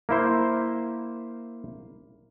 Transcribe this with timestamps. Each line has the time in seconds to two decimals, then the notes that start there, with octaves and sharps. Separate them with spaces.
0.09 A#3 E4 C5